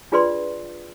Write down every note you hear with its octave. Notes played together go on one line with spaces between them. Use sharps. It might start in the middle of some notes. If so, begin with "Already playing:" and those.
D4 F4 G#4 B4 D5 C6